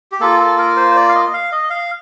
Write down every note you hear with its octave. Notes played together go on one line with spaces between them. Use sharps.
G4
A#3 F4 A4
A4
A#4
C5
C5
D5
F5
D#5
D#5
F5
D#5
F5